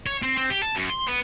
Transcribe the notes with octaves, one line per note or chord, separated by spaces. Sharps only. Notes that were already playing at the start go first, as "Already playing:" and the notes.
C#5
C4
C4
G4
A5
F#2
C6
B3